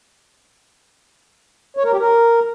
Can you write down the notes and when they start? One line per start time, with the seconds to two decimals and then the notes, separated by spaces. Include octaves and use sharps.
1.77 C#5
1.84 A#4
1.92 G4
1.99 A#4